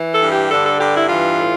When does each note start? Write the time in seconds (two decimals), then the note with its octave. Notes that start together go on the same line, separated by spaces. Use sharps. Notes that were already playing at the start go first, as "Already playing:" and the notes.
Already playing: E3
0.13 A4
0.22 G2
0.32 G4
0.51 D3 A4
0.65 A4
0.80 G2 G4
0.95 E4
1.09 E3 F4
1.37 A2